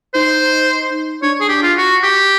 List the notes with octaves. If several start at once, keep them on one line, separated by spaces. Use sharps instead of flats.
D#4 C5
D4 C#5
G#4
G4
F4
F#4
G4